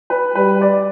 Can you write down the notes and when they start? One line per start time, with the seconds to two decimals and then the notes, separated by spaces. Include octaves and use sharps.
0.10 B4
0.35 G3 B4
0.61 D5